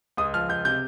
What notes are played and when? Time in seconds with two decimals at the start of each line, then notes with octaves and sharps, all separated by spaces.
0.17 C#2 D#6
0.34 F3 F6
0.49 C#2 G6
0.65 C3 G6